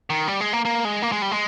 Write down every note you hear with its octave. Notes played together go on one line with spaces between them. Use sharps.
D#3
G3
G#3
A#3
A#3
G#3
A#3
G#3
G3
G#3